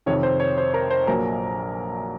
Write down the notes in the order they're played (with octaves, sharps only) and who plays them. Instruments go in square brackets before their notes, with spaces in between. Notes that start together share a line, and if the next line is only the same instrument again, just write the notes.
[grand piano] F2 C3 D#3 C#5
C5
C#5
C5
A#4
C5
A#1 A#2 F#3 A#4